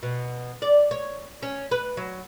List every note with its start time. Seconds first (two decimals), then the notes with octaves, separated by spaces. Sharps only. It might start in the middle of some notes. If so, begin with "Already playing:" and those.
0.03 B2
0.62 D5
0.91 C#5
1.43 C#4
1.71 B4
1.97 F#3